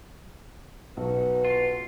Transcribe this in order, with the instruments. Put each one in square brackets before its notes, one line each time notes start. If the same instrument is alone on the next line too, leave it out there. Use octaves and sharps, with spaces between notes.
[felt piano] B1 [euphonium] B3 [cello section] C#4 D#4 F#4
[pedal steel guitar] F4